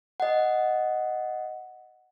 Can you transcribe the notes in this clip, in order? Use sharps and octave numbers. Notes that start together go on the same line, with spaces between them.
D#5 F#5